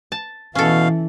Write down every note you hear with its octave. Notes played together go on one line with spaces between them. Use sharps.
A5
B2 E3 C#4 A4 F5